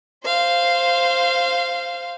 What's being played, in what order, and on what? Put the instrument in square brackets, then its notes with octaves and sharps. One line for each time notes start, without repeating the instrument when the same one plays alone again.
[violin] C5 F5